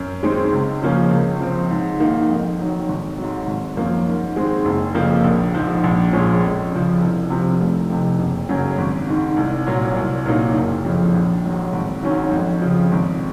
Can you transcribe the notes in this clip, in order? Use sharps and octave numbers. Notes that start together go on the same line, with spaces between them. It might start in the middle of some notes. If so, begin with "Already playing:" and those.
Already playing: F#2
D#3 G#3 C4 D#4
C#2
C#3 F3 A#3 C#4
C#2
C#3 F3 C4
G#2
D#3 A#3 D#4
F2
D#3 F#3
G#1
G#2 F#3
G#1
F#2 F3 A#3
G#2
D#3 G#3 C4
F#1
F2 C#3 F3 A#3
A#1
G#2 F3
A#1
A#2 F3 G#3 C#4
F2
C#3 F3
C2
C3 F3
F1
F2 C3
F#1
F#2 C#3 F#3 C#4
G#1
G#2 D#3
C2
A#2 F#3
C2
A#2 F#3 A#3 D#4
F#1
F2 C#3 F3
A#1
G#2 D#3 F#3
G#1
G#2 D#3 F#3 C#4
F2
C#3 F3
G#1